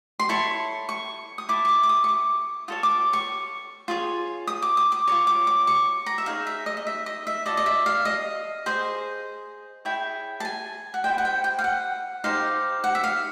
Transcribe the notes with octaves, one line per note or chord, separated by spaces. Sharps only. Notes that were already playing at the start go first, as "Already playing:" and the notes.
C6
E4 A4 C#5 C#6
C#6
D#6
E4 A4 D6
C#6
D6
D6
D#6
C#6
D6
F4 A4 C#5 D#6
D6
C#6
F4 G#4 C#5
D#6
D6
D#6
D6
F4 A#4 C#5 C#6
D6
D6
C#6
A#5
E5
D#4 G#4 C#5 F5
E5
D#5
D#5
E5
D#5
E5
F4 A4 D5 D#5
D#5
E5
F5
D#5
G#4 C5 D#5
E4 G#4 C#5 G5
A5
G#5
F#5
E4 G#4 C5 D#5 G5
F#5
G5
G5
F5
F#5
D#4 G4 C5 F5
F#5
E5
F5